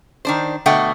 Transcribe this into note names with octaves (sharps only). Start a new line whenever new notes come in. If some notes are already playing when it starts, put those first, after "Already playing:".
D#3 D4 C5
B2 D3 A3 F#5 G5